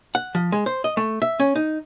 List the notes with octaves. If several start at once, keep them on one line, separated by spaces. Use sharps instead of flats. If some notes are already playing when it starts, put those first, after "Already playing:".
F#5
F3
G#3
C5
D#5
A3
E5
C#4
D#4